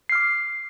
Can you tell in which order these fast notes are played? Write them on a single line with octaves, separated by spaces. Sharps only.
C7 F6 D6